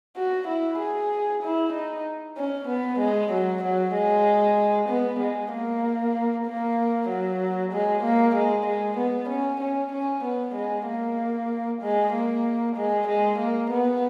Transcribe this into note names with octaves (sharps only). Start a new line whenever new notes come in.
F#4
E4
G#4
E4
D#4
C#4
B3
G#3
F#3
F#3
G#3
B3
G#3
A#3
A#3
F#3
G#3
A#3
G#3
G#3
B3
C#4
C#4
C#4
B3
G#3
A#3
G#3
A#3
G#3
G#3
A#3
B3